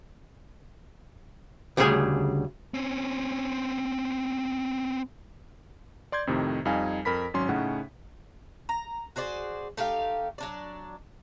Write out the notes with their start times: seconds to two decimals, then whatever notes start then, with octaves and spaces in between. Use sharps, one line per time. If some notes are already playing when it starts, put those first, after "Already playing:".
1.77 D2 C#3 G3 A#3 G#4 G#5
2.74 C4 C#4
6.12 D5 C6 G6 G#6
6.27 F2 A2 C3 D#3
6.65 F2 G3 D#4 F5 G#5
7.05 F2 A#4 B5 B6
7.34 G#1 F#3 C#4 C6
7.49 A2 C#3 C#4 D#4 F#5
8.69 A#5
9.16 F#4 G#4 C5 D5
9.77 A3 D#4 G4 F5
10.38 F#3 D4 D5